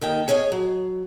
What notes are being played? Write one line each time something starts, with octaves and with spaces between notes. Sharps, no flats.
D#2 D#3 D#4 G5
G#4 C#5 D#5 F5 G#5
F#3